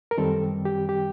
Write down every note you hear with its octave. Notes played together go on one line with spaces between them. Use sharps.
A#4
F#2 D#3 G3 C4 A4
G4
G4